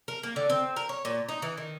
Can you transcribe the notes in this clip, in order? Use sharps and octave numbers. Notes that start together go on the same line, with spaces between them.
A#4
A#3
D3
C4
A#4
C#5
A#2
D#4
E3
D#3